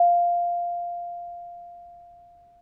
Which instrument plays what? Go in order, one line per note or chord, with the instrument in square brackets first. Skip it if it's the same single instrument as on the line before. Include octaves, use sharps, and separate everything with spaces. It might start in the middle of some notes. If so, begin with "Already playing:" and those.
Already playing: [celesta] F5